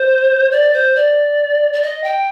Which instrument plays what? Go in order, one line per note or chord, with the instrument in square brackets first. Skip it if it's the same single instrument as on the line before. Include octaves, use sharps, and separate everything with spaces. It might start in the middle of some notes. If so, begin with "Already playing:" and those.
Already playing: [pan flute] C5
D5
C5
D5
D5
D#5
G5